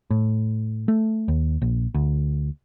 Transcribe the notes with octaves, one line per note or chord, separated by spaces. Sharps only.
A2
A3
D#2
A#1
D2